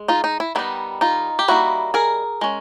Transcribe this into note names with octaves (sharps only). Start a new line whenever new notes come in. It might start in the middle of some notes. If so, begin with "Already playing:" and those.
Already playing: G#3
D#4 F4
D#4
E4
D#3 G3 B3 D#4 E4
D#4 F4
G4
G3 A#3 D#4 E4 F#4
G#4 A#4
G#3 C#4